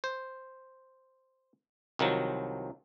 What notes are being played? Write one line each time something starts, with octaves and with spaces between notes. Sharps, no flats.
C5
C2 D#3 F3 F#3